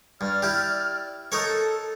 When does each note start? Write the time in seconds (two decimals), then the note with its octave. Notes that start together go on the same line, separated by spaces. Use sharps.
0.21 G2 D5 F6
0.42 E4 G4
1.32 D#4 A4 A#4 C#5